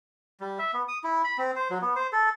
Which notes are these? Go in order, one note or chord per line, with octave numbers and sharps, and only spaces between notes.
G3
E5
B3
D#6
E4
B5
C4
C5
F#3
B3
C5
A4